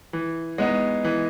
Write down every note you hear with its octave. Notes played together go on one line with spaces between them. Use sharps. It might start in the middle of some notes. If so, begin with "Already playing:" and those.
E3
G#3 B3 D#4
E3